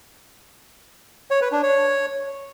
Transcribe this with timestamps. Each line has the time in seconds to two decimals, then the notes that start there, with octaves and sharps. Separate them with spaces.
1.31 C#5
1.41 B4
1.52 D4
1.63 C#5